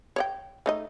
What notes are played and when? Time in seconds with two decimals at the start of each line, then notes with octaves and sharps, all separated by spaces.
0.16 C#5 D5 G5
0.66 A3 D#4 D#5